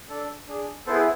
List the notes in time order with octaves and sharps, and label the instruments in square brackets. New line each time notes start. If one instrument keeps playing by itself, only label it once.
[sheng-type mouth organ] D4 A4
D4 G#4
B3 E4 G#4 A4 C5